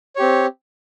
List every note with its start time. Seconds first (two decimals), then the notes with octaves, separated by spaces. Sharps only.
0.16 C#5
0.19 G4
0.22 C4